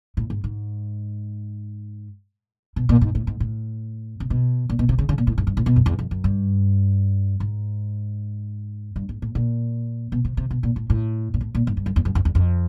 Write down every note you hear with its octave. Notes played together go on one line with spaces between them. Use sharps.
A2
G#2
G#2
B2
A#2
G#2
A2
G#2
A2
C3
B2
A#2
B2
C3
C#3
C#3
A#2
A2
G#2
G2
A2
B2
F#2
E2
F2
F#2
G2
G#2
G2
G#2
A2
A#2
B2
C3
C3
B2
A#2
A2
A2
A#2
A2
A#2
G#2
G2
F#2
E2
F#2
F2
E2
F2